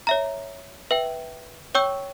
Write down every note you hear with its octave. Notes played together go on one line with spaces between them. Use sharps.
C#5 E5 A#5
B4 E5 G5
C#5 G5 C#6 E6 G6